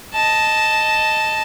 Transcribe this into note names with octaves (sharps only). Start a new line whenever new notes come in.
D#5 A5